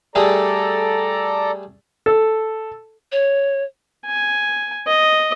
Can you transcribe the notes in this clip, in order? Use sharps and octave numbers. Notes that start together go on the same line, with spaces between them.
G3 A3 G#4 A4 D5 A#5
A4
C#5
G#5
D#5